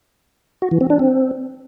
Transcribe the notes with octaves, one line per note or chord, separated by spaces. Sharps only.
F#4
E3
C4
D4
C4